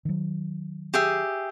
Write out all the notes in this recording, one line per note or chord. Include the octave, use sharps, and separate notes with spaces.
D#3 F#3
G4 G#4 E5